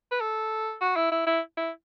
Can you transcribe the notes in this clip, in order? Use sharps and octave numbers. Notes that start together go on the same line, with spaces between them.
B4
A4
F#4
E4
E4
E4
E4